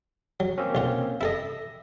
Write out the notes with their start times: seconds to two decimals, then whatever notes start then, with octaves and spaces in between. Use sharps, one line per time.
0.40 F#3
0.58 A#3 C4 C#4
0.75 B1 F4 F#5
1.21 E4 A4 D#5 E5 A#6